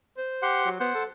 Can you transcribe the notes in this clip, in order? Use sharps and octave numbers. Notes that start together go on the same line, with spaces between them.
C5
G4 F#5 C6
F#3
B3 C5 F#5
A4